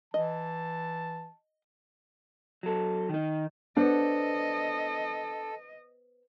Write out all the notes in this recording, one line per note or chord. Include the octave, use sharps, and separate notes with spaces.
E3 D#5 A5
F#3 A4
D#3 D#4
B3 D4 A4 C5 D#5 F#5